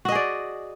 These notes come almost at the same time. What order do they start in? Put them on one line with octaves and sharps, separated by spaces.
F#4 D#5 G#4 D5